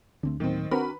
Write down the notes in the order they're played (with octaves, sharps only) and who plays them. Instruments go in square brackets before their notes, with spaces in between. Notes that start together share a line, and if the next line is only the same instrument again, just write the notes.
[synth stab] D2 [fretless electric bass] A3 C4 D4
[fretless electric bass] A2 F#3 A#3 [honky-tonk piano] D#3 C4
[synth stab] C4 F#4 A#4 [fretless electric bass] D4 [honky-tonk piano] B4 B5